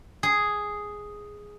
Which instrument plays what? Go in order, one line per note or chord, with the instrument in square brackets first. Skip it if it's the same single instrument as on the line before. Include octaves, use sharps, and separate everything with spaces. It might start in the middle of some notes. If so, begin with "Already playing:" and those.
[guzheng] G#4